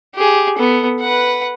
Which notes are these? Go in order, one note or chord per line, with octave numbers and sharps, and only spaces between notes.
G4 G#4
B3 A4
B4 F#5